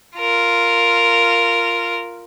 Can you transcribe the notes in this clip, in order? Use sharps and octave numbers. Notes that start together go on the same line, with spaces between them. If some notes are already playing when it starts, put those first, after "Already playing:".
F4 A#4